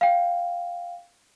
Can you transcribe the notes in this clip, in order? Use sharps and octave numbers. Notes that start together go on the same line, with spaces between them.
F5 G5